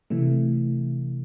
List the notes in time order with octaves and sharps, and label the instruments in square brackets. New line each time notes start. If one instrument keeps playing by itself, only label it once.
[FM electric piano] C3 E3 A3